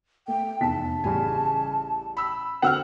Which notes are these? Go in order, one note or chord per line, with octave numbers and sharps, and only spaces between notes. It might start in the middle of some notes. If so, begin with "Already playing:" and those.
A3 G5
F1 E2 A5 B6
A1 C#3 G3 G#5
B5 E6
D3 C4 F#4 F#5 E6 F6